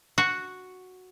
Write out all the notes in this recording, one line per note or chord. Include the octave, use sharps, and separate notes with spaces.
F#4